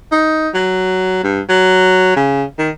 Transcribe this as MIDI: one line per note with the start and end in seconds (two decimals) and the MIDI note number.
0.12 0.49 63
0.55 1.24 54
1.24 1.41 43
1.49 2.16 54
2.16 2.43 49
2.59 2.70 51